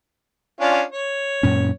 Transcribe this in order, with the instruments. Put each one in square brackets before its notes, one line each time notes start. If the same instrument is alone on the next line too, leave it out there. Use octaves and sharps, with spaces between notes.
[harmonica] C#4 D4 F4
C#5
[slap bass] F#2 A#2 C#4